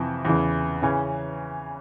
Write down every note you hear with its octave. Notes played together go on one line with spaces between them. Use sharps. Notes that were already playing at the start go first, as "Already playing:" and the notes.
Already playing: F2 C3 E3
E2 C#3 E3
C#3 E3 C#4